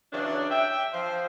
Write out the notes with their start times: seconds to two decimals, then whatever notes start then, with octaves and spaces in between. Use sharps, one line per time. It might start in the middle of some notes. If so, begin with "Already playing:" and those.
0.13 C#3 E3 F#3 D4
0.50 E5 G5
0.93 F3 C5